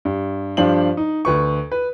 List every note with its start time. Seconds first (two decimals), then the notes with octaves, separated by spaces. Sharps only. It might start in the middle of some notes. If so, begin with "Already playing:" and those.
0.05 G2
0.57 G2 F3 D4 C5 F5 F#7
0.97 D#4
1.25 D2 B4 C#6
1.72 B4